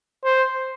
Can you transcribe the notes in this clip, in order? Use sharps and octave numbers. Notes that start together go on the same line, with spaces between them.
C5